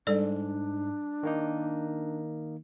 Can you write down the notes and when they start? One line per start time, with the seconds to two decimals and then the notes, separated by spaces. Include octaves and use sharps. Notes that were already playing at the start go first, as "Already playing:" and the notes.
0.07 G#2 G3 D4 A4 D5
1.23 D#3 A#3 D#4